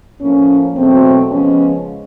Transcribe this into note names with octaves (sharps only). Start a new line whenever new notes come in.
A2 F3 A#3 C#4
E2 B2 F#3 A3 C4
C#3 F3 G#3 B3 C#4